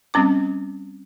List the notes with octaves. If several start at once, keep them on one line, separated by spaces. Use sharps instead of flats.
G3 C4 C#4 D6